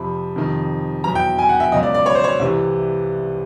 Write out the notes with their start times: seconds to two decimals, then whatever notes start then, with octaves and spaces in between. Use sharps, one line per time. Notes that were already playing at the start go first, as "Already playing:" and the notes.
Already playing: F2 C3 F3 B5
0.36 F2 C3 D#3
1.04 E2 B2 F#3 A#5
1.15 G5
1.39 G#5
1.49 F#5
1.60 E5
1.72 C#2 B2 F#3 D#5
1.83 D5
1.95 D5
2.06 C#5
2.15 C5
2.24 C#5
2.39 C2 C3 E3